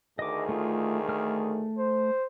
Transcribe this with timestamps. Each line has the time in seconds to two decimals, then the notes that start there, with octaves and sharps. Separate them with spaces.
0.19 D2 D#3 G#4 D#5 D6
0.49 A3 F4
1.08 A3 F6
1.78 C5